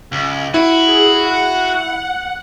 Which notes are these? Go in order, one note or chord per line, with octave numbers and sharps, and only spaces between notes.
C#2
E4 F#4
G#4
F#5